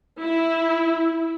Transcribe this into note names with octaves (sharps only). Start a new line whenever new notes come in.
E4